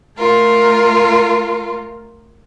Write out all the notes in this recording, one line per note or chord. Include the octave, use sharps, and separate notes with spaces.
A3 F4 A#4